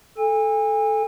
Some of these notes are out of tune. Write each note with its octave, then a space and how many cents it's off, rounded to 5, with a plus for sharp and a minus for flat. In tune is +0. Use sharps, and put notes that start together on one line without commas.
A4 -10 G#5 -35